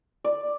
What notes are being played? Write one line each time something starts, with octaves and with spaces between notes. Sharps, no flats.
D5